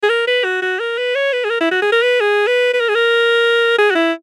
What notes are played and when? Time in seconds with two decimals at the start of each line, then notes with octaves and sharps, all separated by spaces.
0.03 G#4
0.10 A#4
0.27 B4
0.44 F#4
0.62 F#4
0.80 A#4
0.98 B4
1.15 C#5
1.33 B4
1.45 G#4
1.50 A#4
1.61 E4
1.71 F#4
1.82 G#4
1.92 A#4
2.03 B4
2.21 G#4
2.47 B4
2.74 B4
2.80 A#4
2.89 G#4
2.95 A#4
3.78 G#4
3.91 F#4
3.95 E4